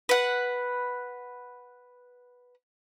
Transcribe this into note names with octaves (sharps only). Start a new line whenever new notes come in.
B4 F#5